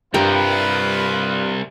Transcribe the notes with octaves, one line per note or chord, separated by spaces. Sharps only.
C2 G2 F4 A#4 B4 G5